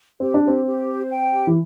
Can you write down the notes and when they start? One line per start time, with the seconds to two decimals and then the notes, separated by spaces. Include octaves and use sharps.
0.20 C4 G4
0.34 D4
0.43 C4 G4
0.65 G4
0.88 C5
1.10 G5
1.32 G4
1.47 E3